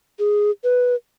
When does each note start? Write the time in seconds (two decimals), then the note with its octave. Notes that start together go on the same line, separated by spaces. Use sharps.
0.19 G#4
0.64 B4